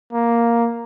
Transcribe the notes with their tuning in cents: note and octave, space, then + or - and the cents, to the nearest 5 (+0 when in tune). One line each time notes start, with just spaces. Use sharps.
A#3 +5